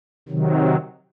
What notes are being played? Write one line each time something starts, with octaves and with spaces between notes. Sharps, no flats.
C3 D#3 F#3